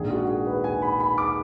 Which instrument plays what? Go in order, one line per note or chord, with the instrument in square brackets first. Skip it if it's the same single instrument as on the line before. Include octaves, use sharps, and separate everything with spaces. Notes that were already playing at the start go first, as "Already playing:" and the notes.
Already playing: [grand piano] A#1 G#2 D#3 G#4
F#4
G#4
B4
G#5
B5
B5
D6